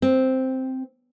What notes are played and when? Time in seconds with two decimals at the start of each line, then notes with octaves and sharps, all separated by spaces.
0.02 C4